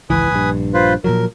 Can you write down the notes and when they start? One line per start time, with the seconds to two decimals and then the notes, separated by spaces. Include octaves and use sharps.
0.10 G#1 C#2 E3 B4 G#5 D#6
0.31 A#1 G2
0.74 F4 B4 C5
1.04 A#2 F3 F#3 A#4